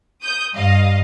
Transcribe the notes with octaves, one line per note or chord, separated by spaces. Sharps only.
D#6 G6
G2 D#5 F5